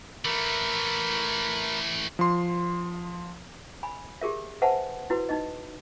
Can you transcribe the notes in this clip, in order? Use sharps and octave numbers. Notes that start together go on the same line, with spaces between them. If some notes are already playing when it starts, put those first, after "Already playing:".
E3 A3 A#4 B5
F3 C6
G#5 B5
G4 G#4 A#4 E5
B4 C5 E5 F#5 G#5 A5
E4 F#4 B4
D#4 D#5